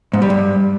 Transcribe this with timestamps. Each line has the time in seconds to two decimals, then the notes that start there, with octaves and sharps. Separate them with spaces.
0.14 G#2
0.22 G3
0.30 G2